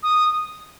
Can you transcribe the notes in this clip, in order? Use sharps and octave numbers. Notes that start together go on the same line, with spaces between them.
D#6